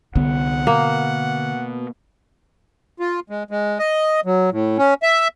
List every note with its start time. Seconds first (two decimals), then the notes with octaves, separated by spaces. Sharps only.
0.16 C2 D3 B3 F#5
0.67 B2 A#3
3.00 F4
3.30 G#3
3.51 G#3
3.79 D#5
4.25 F#3
4.52 A2
4.78 C#4
5.03 E5